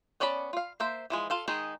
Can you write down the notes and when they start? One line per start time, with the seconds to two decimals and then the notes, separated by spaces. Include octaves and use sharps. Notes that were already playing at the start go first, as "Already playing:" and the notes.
0.20 B3 C#4 D5 A5 B5
0.53 F4 F5
0.80 A#3 C5 E5
1.10 E3 F3 G#3
1.30 F4 A4 F5
1.48 D#3 G#3 D#4 G#4